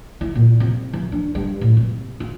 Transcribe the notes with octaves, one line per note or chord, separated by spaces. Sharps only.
E4
A#2
C3
E3
D4
G2
A2
C3
F4